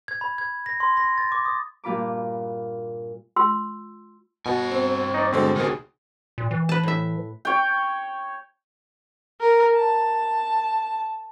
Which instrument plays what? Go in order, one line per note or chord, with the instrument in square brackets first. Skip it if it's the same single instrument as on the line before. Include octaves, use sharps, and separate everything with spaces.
[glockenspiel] G#6
B5
G#6
A#6
C6
A#6
A6
D6
D#6
[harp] G2 A#2 F4 B5 D6
[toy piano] F4 C6 E6
[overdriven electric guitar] G2 G#5 [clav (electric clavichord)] B2
[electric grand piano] C4
[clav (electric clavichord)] D#4 D5
[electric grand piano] B2 D3 G#3 [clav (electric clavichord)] C4
[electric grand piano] D2 B2 G#4 [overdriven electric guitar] D#3 G4
[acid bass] A#2
E3
[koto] B4 A5
A2 E5
[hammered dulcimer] C#5 G5
[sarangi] A#4
A5